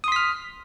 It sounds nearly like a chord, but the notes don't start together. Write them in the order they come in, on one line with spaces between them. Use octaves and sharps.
D#6 C6 B6 F6